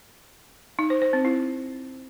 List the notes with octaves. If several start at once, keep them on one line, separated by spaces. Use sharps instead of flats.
D#4
C5
C5
C4
E4